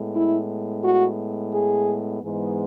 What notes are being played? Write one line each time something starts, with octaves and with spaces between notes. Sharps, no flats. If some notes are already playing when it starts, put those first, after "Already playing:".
Already playing: A2 G#3 B3
E4
F#4
G#4
G#2 E3 G#3 B3